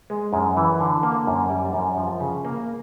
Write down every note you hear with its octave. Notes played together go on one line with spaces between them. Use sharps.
G#3
F#2
E3
D3
A#3
F#2
G3
F#2
F3
C#3
A#3